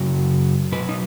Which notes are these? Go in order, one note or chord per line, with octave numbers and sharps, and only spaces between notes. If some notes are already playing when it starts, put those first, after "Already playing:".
Already playing: F#2 C#3 F#3
B2 F#3 B4
D#4